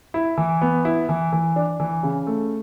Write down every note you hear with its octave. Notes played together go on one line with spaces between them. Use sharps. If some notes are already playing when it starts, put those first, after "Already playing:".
E4
E3
B3
E4
E3
E3
D4
E3
C#3
A3